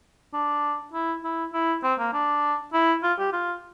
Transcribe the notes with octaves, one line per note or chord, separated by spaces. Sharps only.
D4
E4
E4
E4
C4
A#3
D4
E4
F4
G4
F4